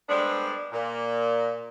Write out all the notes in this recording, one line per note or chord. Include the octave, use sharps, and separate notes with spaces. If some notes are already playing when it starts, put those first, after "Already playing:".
G3 G#3 B3 D4 A4 C5
A#2